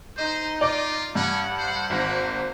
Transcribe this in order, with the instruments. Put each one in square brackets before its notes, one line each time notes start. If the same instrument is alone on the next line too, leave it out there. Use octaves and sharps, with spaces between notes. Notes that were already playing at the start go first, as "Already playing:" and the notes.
[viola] D#4 D#5 [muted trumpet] C5
[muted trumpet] F4 [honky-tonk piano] D5 D6
[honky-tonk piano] G2 [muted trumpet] C#4 [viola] F#5
[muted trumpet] C5
[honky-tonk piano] G#1 [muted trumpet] A#3